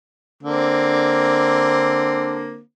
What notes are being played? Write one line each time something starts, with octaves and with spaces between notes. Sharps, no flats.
D3 A#3 C4